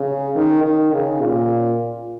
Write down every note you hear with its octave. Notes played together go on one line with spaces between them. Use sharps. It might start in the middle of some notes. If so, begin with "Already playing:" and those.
Already playing: C#3
D#3
D#3
C#3
A#2